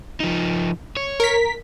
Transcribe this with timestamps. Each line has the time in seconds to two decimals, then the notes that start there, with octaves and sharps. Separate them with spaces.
0.20 F3 D#4
0.97 C#5
1.20 A#4 B6